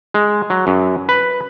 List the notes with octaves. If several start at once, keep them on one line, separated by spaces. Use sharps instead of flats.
G#3
F#3
F#2
B4